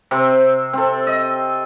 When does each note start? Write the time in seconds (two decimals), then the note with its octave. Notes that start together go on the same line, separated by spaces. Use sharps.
0.11 C3 C4
0.73 C4 A4
1.07 D#5